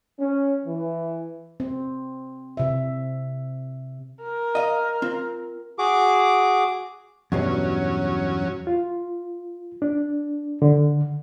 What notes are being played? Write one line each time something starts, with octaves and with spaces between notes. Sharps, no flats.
C#4
E3
C4
C3 E5
A#4
D#5 F5
C4 F4
F#4 G#4 D6
E2 G2 B2 F#3 C#4
F4
D4
D3